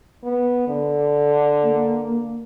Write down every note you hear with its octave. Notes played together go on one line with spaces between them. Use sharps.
B3
D3
A#3